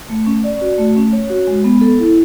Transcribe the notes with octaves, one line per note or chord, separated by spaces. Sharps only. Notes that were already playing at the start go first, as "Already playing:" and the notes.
A3
C#4
D5
F#4
A3
C#4
C#5
F#4
G#3
B3
A4
E4